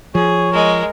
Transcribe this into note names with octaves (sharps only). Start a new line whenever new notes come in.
F3 G#4 C#5
G#3 A#4